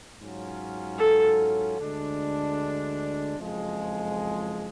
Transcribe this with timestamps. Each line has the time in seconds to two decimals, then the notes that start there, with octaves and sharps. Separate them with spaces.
0.19 G#2 F#3 C#4 F4
0.99 A4
1.78 D2 D3 G#3 D4
3.37 F#1 F2 F3 G#3